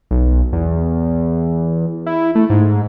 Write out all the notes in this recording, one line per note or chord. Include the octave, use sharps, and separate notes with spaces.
B1
E2
E4
A3
G#2